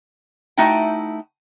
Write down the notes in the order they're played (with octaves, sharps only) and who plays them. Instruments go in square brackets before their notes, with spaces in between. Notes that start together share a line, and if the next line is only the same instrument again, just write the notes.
[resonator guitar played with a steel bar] A3 D#4 E4 F#4 G5